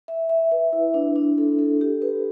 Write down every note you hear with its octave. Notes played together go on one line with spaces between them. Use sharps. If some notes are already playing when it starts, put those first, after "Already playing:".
E5
E5
B4
E4
D4
D4
A4
A4
G4
B4